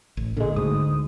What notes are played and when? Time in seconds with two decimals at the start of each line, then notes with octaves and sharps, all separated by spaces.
0.17 A1
0.37 A#2 D3 G#3
0.56 D2 G#2 D#6